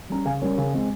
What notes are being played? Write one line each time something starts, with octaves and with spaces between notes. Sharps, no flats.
G3 C#4 A#5
C#3 F5 G#5
G3 C#4 A#4 C#5
C#3
G#3 C4